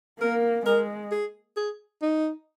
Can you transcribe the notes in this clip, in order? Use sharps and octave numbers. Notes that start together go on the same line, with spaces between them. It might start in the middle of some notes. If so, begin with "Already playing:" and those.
A#3 A#4
G#3 A#4
G#4
G#4
D#4